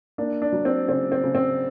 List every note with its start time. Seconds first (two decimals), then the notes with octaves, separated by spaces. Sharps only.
0.18 A#3 D4
0.42 D4
0.52 F#3
0.65 C4
0.88 C#3 C4
1.12 C4
1.24 C#3
1.35 C4